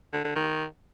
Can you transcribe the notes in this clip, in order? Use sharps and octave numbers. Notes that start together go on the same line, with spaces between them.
D3
D3
D#3